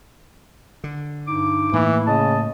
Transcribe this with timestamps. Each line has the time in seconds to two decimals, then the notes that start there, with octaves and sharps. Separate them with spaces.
0.84 D3
1.28 G2 D#4 D6
1.73 A2 E3 A#3
2.07 C#3 D#5 A5